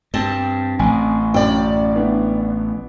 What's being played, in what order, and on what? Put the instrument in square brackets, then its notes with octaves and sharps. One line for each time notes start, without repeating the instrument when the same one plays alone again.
[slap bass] G2 [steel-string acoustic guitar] C4 A5
[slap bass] A1 [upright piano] G#5
[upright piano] F#2 [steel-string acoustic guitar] D5 G5
[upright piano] E3 B3 D4